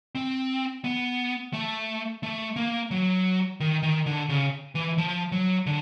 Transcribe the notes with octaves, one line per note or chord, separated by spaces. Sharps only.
C4
B3
A3
A3
A#3
F#3
D#3
D#3
D3
C#3
E3
F3
F#3
D3